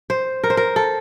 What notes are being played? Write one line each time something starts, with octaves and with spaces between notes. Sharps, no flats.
C5
A#4
C5
A#4
A4